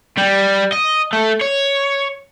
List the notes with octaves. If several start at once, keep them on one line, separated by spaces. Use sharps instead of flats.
G3
D#5
A3
C#5